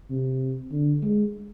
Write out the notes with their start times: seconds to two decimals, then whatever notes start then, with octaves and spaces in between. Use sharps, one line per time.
0.11 C3
0.72 D3
1.02 G#3